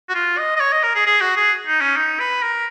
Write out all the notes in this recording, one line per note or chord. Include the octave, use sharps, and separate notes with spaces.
F#4
F4
D#5
D#5
C#5
D#5
A#4
G#4
G#4
F#4
G#4
D#4
C#4
D#4
B4
A#4